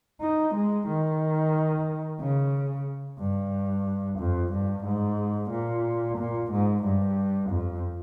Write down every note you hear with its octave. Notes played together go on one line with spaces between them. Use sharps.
D#4
G#3
D#3
C#3
G2
F2
G2
G#2
A#2
A#2
G#2
G2
F2